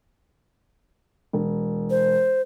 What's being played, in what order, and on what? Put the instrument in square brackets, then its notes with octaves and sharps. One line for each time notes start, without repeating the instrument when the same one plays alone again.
[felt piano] E1
[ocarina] C5